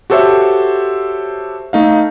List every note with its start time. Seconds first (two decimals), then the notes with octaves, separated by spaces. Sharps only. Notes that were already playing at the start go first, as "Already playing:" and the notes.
0.10 F#4 G4 A4 C5 C#5 E5
1.73 A3 D#4 F5